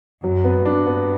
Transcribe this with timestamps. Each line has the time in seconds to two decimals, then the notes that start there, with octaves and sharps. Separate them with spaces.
0.24 F#2 F#3
0.44 B3
0.65 G2 D4
0.87 B3